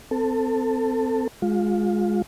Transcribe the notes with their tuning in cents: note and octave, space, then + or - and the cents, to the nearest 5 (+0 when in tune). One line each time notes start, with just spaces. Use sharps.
C4 -25 A4 +20
G#3 +0 F4 +25